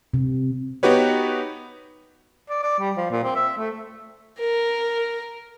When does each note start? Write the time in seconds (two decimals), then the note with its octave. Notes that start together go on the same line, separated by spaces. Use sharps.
0.14 C3
0.83 B3 D#4 F#4 G4 B4 C#5
2.49 D5
2.63 D5
2.79 G3
2.97 F3
3.11 A#2
3.24 C4
3.35 E5
3.57 A3
4.40 A#4